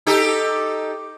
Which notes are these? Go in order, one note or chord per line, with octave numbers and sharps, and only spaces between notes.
D#4 G4 A4